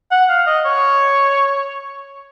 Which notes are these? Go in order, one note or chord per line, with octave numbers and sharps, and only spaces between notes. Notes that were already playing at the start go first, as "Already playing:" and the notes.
F#5
F5
D#5
C#5